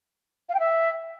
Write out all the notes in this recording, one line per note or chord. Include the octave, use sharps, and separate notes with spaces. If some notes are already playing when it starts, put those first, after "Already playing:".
F5
G5
E5